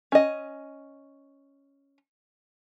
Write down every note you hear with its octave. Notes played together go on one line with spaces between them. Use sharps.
C#4 D#5